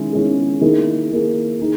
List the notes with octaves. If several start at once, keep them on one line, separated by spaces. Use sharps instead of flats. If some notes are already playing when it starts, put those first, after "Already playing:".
Already playing: D#3 G#3 C#4 E4 G#4
D#3 G#3 C#4 E4 G#4
D#3 A#3 E4 G#4
D#3 A#3 E4 G#4
D#4 G#4